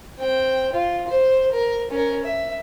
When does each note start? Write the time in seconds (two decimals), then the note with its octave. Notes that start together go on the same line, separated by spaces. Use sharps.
0.19 C4 G5
0.73 F4
1.08 C5
1.52 A#4
1.90 C#4 A#4
2.24 E5